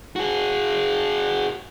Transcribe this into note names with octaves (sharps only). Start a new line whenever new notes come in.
F#4 G#4